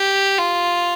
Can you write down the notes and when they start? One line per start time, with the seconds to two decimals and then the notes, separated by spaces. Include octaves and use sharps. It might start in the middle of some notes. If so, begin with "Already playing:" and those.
Already playing: G4
0.38 F4